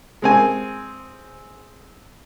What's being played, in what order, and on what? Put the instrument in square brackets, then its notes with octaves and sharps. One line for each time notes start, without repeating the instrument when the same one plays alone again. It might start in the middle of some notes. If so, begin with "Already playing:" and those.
[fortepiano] G#3 C4 G#5